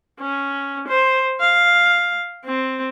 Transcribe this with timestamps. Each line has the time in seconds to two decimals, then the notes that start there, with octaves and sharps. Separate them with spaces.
0.20 C#4
0.88 C5
1.40 F5
2.45 C4